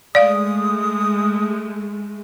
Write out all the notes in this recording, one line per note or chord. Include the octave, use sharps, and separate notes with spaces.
G#3 A3 D5 F5 D#6